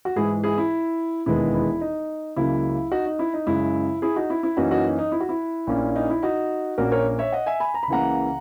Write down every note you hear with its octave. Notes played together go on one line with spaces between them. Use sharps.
F#4
G#2 E3 G#3 E4 G#4
E4 G#4
E4
E1 D#2 D#3 G#3 B3 E4
E4
D#4
C#2 C#3 F#3 A#3 E4
D#4 F#4
D#4
E4
D#4
F#2 C#3 G#3 E4
E4 G#4
D#4 F#4
E4
E4
F#2 E3 A#3 C#4 D#4 F#4
D#4 F#4
D#4
D#4
E4
F#4
E4
A#1 A#2 A#3 C#4
D#4
E4
D#4 F#4
A#1 A#2 A#3 C#4 F#4 A#4
A#4 C#5
C#5 E5
D#5 F#5
E5 G#5
G#5 B5
A#5
B5
C#2 C#3 E3 A#3 F#5 A#5